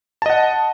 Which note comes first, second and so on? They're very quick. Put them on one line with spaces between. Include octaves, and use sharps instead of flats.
A5 D#5 F#5